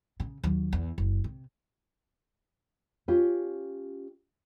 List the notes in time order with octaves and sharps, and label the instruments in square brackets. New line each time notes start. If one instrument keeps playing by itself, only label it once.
[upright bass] C#3
D#2 F#3
E2
F#1
C3
[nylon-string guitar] C#4 F4 G4